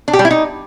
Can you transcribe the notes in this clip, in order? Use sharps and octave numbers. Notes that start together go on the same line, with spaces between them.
D4
G4
G3
E4
D#4